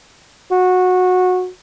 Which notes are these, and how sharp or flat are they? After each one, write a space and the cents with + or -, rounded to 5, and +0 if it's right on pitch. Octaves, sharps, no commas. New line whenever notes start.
F#4 -15